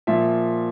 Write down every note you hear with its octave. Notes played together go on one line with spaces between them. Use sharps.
A#2 F3 E5